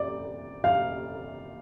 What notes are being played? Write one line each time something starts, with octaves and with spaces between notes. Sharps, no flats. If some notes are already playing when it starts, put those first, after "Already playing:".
Already playing: D5
F5